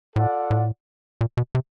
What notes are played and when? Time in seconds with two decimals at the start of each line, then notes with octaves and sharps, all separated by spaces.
0.16 A2 F4 A4 D5 F#5
0.51 A2
1.21 A#2
1.37 B2
1.55 C3